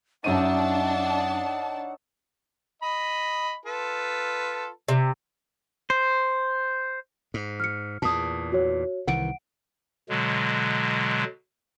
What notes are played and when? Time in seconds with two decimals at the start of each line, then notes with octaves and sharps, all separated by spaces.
0.24 F#2 D4 D#4 C#5 E5 F#5 A5 D#7
2.82 D#5 B5
3.65 F4 A4 B4
4.88 C3
5.90 C5
7.34 G#2
7.60 F6 C#7
8.02 E2 A#2 A5 D#6
8.52 F#4 C#5
9.08 C2 D#3 E3 F#5 D7
10.09 B2 D3 F#3 G#3